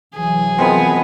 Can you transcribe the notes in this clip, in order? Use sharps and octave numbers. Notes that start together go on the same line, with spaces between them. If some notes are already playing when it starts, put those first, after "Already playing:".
C2 E3 F#3 G#4
F3 G#3 B3 C4 A#4